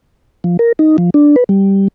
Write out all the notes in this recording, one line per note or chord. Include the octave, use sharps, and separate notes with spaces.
F3
A#4
D#4
F3
D4
B4
G3